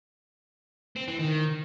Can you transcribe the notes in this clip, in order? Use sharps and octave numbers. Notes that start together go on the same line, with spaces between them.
C4
E3
D#3